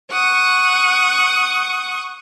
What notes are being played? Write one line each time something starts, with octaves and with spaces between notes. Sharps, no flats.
F#5 C#6 D#6